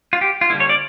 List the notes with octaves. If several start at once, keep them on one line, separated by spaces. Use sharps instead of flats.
F4
G4
F4
D3 G3 A#3 E4
C#5
D5